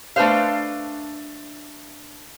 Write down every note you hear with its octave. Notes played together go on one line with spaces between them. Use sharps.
A3 D4 B4 C5 F5